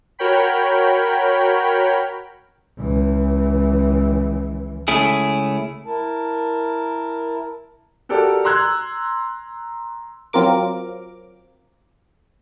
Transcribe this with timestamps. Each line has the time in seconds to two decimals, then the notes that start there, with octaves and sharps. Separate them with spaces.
0.19 F#4 A#4 C#5 G5 B5
2.78 C#2 E3
4.88 C#2 A3 C#4 E4 G#4
5.86 E4 A#4 A5
8.09 F#4 G4 A4 A#4 D5
8.45 A#5 C6 E6 F#6 G#6
10.33 F#3 C4 F4 A#4 D6